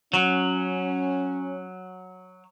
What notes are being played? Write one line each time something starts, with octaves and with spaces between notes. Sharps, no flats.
F#3 C#4